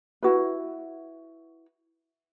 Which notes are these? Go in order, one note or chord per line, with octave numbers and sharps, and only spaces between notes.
E4 F#4 B4